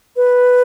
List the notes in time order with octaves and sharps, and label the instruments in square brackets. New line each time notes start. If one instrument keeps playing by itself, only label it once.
[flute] B4